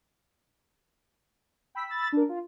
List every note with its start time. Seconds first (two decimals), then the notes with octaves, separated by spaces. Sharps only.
1.75 G5 B5 E6 B6
1.88 B5 E6 A6
2.12 D4 A#4
2.29 F4